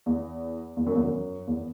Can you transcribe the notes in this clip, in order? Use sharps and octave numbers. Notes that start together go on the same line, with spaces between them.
E2
E2
F#2
E2
F#2
E2